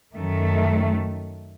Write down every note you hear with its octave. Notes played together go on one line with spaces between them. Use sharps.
F#2 D#3 A3